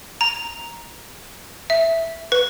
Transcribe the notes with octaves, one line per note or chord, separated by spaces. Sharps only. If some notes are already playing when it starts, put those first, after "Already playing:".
A#5
E5
B4